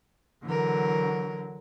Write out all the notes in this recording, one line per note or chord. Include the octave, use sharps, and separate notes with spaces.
D3 E3 F#3 A#4